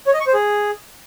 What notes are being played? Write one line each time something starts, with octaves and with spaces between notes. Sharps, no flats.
C#5
D#5
C#6
C5
G#4